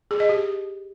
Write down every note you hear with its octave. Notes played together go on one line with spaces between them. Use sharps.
G#4
D#5
G4